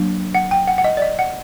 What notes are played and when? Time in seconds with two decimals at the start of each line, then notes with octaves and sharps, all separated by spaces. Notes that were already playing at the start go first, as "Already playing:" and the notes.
Already playing: F#3 A#3 D4
0.35 F#5
0.51 G5
0.67 F#5
0.78 F#5
0.84 D#5
0.97 D5
1.02 D#5
1.19 F#5